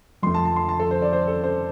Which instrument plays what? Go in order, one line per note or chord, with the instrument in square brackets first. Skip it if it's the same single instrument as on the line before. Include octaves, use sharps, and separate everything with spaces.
[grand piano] F2 F3 A3 C6
A5
A5
C6
A5
A4
C5
D5
C5
A4
C5